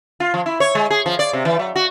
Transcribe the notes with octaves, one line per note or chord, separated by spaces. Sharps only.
F4
F3
E4
C#5
G#3
G#4
F3
D5
C3
E3
F#3
F#4